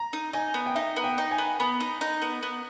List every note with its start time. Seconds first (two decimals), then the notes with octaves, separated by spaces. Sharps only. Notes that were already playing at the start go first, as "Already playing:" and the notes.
Already playing: A#5
0.13 D#4
0.33 D#4 G#5
0.54 B3
0.66 G5
0.75 D#4 E5
0.96 B3
1.04 G5
1.18 D#4
1.31 G#5
1.38 B3
1.60 B3 B5
1.80 D#4
2.01 D#4
2.22 B3
2.43 B3